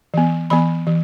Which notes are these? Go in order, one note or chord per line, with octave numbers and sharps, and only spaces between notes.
E3 B3
E3 B3 B5
E3